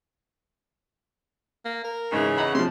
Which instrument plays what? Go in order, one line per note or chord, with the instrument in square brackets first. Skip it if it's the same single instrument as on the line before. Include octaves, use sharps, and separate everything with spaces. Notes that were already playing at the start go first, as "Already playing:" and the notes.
[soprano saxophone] A#3
A#4
[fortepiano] G#2 [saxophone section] C#3 E3
[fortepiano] D#5 A#5 B5 [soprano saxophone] F#5
[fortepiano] C3 F3 [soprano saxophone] C6